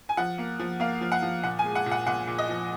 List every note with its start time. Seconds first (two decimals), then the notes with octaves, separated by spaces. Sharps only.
0.09 G#5
0.17 F3 F#5
0.38 A#3
0.59 F3
0.80 A#3 F5
1.01 F3
1.12 F#5
1.22 F3
1.43 A#2 F#5
1.59 G#5
1.64 G#3
1.75 F#5
1.86 A#2
1.91 F#5
2.07 A#2 F#5
2.27 A#2
2.38 D#5
2.49 F3